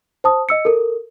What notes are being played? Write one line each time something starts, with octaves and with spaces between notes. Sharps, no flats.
C5 A5 D#6
D#5 E6 C#7
A4 A#4